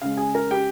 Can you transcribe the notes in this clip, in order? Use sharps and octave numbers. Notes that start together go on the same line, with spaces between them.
C#3 G#3 F5
G#4 G#5
A#4 A#5
G4 G5